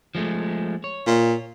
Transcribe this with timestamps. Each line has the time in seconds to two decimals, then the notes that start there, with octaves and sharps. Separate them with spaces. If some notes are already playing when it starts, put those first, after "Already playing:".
0.15 F3 G#3 A3
0.84 C#5
1.06 A#2